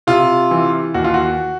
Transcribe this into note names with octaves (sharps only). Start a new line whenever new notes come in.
C3 F4
E3
D#2 F#4
F4
F#4